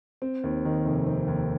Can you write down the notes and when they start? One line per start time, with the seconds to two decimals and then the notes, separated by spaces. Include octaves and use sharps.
0.22 C4
0.44 D#2
0.65 D#3
0.86 F1
1.07 C4
1.27 D#2